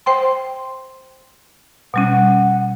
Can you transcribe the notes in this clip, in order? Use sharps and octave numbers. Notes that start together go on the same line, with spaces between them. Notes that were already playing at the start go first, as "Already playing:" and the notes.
C5 G5 C6
B2 G3 C#4 F#5